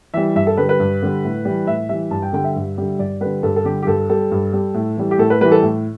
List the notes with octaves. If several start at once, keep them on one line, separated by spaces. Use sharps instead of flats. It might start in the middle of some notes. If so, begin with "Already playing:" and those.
E3 G3 E5
G2 E5
A4
D3 G3 B4
B4
G2
D3 G3
A2
E3 G3
A2 E5
E3 G3 E5
G2 A5
G5
D3 G3 G5
E5
G2
D3 G3
G2 D5
D3 G3 B4
G2 A4
A4
D3 G3 G4
G4
G2 A4
G3 A4
G2
G3
A2
E3 G3
G4
A2 A4
B4
E3 G3 B4
A4
A2